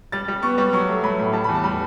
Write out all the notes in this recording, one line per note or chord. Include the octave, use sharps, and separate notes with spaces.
G3 A6
G3
B3 C#6
G3
F#3 C#6
A3
F#3 B5
A2
G3 A5
B5
E2
A5
G3 B5